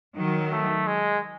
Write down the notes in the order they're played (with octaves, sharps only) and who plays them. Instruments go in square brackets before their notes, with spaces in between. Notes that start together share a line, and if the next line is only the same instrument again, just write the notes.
[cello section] D#3 F#3
[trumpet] A3
G#3